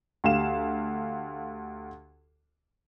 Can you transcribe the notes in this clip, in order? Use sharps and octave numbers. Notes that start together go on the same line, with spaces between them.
D2 G4 F5 E7